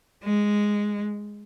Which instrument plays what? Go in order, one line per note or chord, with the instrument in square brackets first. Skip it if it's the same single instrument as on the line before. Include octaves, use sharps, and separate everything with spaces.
[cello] G#3